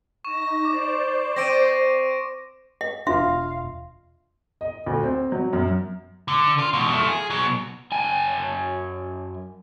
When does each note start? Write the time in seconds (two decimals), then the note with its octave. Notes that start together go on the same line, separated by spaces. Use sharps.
0.25 D#4 C#6 A#6 E7
0.65 C5 D5 D6
1.36 C4 A#6 D7 D#7
2.81 D#5
3.07 E1 D4 F4 E5 F5 C6
4.61 D#5
4.86 D2
5.04 C4
5.32 F#3
5.53 F#2
6.28 D3
6.59 F4
6.73 E2 B2
6.92 F3 A3
7.08 G#4
7.30 B2 F#3
7.92 F#2 G#5 A5